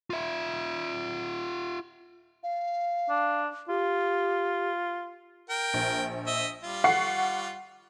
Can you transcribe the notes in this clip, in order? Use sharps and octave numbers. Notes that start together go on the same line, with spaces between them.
F4 E5
F5
D4
F4 G4
A#4 G5
A#1
D#5 E5
G3 F4
F#5 C#6 C7